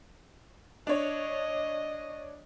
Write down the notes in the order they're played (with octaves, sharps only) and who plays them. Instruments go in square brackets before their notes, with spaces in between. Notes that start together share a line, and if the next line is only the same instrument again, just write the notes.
[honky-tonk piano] D4 C#5 [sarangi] D#5